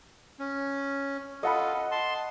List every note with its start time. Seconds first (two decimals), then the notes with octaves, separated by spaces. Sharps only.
0.39 C#4
1.43 F4 A4 D#5 F#5 B5
1.91 A5 C6